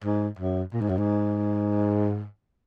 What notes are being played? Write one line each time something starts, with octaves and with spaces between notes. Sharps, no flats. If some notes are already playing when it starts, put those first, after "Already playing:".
G#2
F#2
A#2
G#2
F#2
G#2